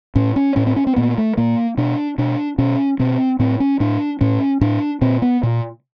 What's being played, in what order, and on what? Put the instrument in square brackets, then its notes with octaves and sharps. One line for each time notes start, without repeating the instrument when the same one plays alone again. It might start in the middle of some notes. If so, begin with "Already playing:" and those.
[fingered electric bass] A2 C#4
C#4
A2 C#4
C4
C#4
C4
A#2 B3
A3
A#2 A#3
B2 D4
B2 D4
B2 C#4
B2 C4
A2 C4
C#4
A2 D4
A2 C#4
A2 D4
A#2 C4
B3
A#2